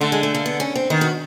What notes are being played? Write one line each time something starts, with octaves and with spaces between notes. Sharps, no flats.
D3 A3
G#3
A3
A#3
B3
C#4
C4
D#3 B3
F#4